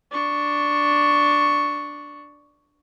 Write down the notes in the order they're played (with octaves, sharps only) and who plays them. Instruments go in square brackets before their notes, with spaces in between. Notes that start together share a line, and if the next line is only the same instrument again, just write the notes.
[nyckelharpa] D4 C#6